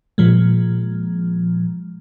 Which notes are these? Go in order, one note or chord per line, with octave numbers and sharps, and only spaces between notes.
A#2 F3 G#3